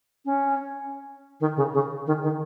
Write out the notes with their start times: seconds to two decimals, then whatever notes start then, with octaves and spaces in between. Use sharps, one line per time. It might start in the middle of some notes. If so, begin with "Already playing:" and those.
0.25 C#4
1.40 D#3
1.56 C#3
1.73 C#3
2.06 D#3
2.22 D#3